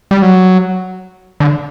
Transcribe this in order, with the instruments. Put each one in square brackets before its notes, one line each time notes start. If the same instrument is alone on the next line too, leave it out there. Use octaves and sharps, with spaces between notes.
[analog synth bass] G3
F#3
D3